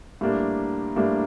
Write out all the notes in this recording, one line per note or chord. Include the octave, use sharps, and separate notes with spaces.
A2 G3 A#3 D4
A2 G3 A#3 D4